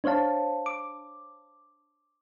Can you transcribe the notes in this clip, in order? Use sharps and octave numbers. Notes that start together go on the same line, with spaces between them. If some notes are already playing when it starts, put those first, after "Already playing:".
D4 C5 C#5 F5 A5
D6